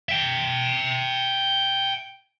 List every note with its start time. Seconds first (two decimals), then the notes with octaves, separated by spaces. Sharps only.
0.09 E5 G5